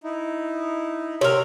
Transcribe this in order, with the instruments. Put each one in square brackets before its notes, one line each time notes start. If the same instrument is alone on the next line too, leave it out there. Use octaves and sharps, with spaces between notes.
[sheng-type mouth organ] D#4 E4
[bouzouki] C3 A#4 [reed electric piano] C#5